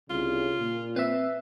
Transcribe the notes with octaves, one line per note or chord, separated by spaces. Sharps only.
C2 C#3 F4
A#2
C4 B4 E5 E6